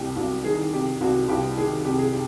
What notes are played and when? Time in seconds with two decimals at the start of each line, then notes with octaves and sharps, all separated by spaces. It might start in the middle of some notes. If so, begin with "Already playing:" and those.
Already playing: C2 C3 G4
0.16 C2 F#4
0.44 D#3 G#4
0.72 C3 G4
1.01 C2 F#4
1.28 C2 G4
1.57 D#3 G#4
1.85 C3 G4
1.98 G#4
2.12 G4